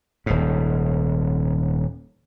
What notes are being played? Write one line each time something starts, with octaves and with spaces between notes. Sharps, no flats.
D#1 G#2